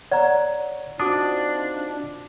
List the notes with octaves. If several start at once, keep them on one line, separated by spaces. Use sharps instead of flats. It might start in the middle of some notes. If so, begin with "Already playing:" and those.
C#5 D5 F#5 A#5
C4 D4 D#4 F4 F#4 D6 D#6